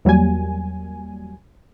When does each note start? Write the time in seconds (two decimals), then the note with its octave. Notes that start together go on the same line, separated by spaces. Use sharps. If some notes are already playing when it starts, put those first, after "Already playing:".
0.05 E2 F#3 G3 A#3 G#5